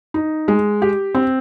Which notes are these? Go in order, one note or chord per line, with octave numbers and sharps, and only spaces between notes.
D#4
G#3
G4
C4